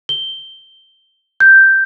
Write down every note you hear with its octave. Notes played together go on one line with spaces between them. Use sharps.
G7
G6